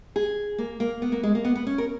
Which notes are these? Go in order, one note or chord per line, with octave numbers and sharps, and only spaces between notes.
G#4
A#3
A#3
B3
A#3
G#3
A#3
B3
B3
C#4
A#4